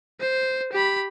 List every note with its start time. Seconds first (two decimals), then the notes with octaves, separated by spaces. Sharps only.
0.20 C5
0.72 G4 B5